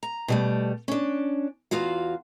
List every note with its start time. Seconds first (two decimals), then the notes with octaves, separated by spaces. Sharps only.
0.03 A#5
0.28 B2 G3 A3
0.88 C#4 D4
1.71 E2 F4 F#4 F5